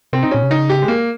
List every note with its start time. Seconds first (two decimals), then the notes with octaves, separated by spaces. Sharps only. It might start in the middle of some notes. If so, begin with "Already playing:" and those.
0.13 C3 C4
0.23 D#4
0.31 A#2 C#4
0.43 C3
0.51 C#3 D#4
0.69 G4
0.82 G#3
0.88 A#3